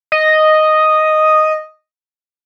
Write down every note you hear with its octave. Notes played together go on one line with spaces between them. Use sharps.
D#5